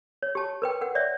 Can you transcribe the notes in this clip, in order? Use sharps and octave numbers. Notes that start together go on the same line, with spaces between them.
C#5
G4 A5
A#4 B4 G5
A#4 F#5
C#5 D5 E5